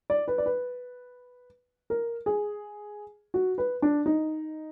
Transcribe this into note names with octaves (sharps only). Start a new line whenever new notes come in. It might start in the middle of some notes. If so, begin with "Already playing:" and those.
D5
B4
D5
B4
A#4
G#4
F#4
B4
D4
D#4